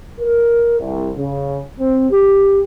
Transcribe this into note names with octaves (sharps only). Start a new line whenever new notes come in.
A#4
C2
C#3
C4
G4